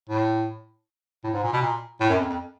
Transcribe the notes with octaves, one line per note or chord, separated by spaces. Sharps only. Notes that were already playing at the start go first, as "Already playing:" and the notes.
A2
A2
G#2
A#2
B2
A#2
A2
F#2
F2
F2